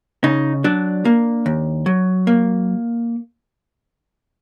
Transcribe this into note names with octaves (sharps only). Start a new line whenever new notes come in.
C#3 D#4
F#3 D4
A#3
D#2
F#3
A#3